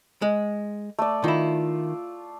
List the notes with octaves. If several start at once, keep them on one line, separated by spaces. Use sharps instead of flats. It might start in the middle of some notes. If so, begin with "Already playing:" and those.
G#3
A3 D5
D#3 E4 F4